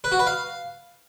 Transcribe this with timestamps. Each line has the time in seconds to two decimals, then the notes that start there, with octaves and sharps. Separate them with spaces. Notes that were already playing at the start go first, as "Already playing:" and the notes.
0.04 B4
0.12 F#4
0.19 B4
0.27 F5